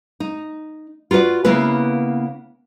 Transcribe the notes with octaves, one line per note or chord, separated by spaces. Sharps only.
D#4
F4 F#4 A4 B4 D5
C#3 A#3 B3 E4 B4